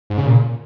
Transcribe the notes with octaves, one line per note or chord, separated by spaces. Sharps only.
G#2
C#3
A#2